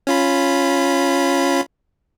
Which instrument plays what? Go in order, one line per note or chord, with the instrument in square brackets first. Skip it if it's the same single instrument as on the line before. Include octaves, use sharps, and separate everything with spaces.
[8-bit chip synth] C#4 F4 B5